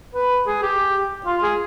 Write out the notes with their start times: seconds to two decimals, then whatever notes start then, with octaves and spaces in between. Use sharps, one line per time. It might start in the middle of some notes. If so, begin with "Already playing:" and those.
0.15 B4
0.47 G#4
0.63 G4
1.26 F4
1.43 G#4